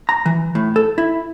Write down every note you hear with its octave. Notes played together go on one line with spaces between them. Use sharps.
A#5
E3
A2
A4
E4